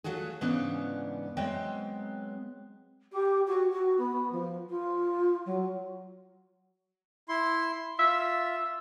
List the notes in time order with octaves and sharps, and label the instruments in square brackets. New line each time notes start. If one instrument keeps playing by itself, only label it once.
[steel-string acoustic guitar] F#3 A3 F4 F#4 G#4
G#2 C#3 E3 B3 C#4 D4
F#3 G#3 B3 C4 E5 G5
[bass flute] G4
F#4
F#4
B3
F3
F4
F#3
[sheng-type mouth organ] E4 C6
[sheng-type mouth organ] F4 [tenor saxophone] E5